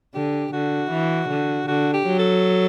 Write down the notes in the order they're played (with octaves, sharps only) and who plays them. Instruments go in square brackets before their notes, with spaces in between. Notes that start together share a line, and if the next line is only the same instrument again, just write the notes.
[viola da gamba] D3 [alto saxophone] G4
[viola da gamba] D3 [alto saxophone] F#4
[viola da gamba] E3
D3
[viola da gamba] D3 [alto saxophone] F#4
[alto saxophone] G4
[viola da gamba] F#3
[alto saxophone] A4